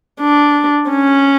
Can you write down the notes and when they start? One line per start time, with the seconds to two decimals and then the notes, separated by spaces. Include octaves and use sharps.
0.21 D4
0.90 C#4